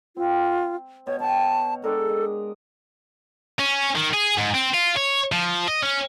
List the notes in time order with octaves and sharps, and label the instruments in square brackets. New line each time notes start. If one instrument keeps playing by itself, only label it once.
[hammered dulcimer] C4 [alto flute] F4
[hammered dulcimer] B2 [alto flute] C#5
[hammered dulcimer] C#5 G5 [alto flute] A5
[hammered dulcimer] G#3 D4 A#4 [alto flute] A4
[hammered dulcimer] D#5
[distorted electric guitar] C#4
D#3
G#4
G#2
C4
F4
C#5
F3
D#5
C#4